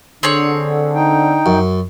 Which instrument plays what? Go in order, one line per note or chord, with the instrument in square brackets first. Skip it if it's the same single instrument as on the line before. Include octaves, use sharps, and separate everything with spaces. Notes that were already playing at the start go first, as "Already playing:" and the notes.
[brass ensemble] D3 [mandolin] C4 G#4 C#5
[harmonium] D#4 G5
[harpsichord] F#2